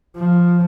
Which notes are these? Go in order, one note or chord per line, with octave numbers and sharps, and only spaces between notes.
F3